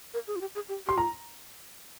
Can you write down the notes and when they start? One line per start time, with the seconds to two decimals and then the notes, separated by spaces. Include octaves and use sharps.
0.14 A#4
0.27 G#4
0.36 F4
0.41 G4
0.55 G#4
0.69 G4
0.87 G4 C6
0.97 F4 A#5